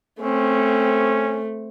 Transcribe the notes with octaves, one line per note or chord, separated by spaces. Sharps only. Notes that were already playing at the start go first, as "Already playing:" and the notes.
A3 C4 C#4